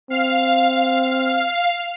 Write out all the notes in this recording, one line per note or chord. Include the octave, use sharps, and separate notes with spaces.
C4 F5